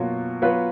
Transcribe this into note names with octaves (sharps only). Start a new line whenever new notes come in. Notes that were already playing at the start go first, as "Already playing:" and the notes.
Already playing: B2 F#3 A#3 F4
F#3 B3 F4 B4